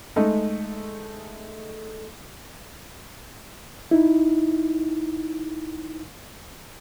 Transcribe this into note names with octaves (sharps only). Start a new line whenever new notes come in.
G#3 A3 D#4
D#4 E4